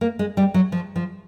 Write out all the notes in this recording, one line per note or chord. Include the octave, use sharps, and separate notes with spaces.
A#3
G#3
G3
F#3
F3
F3